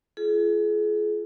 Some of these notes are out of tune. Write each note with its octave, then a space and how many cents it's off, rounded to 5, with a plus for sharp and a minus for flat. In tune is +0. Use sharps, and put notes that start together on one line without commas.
F4 -30 G#4 +35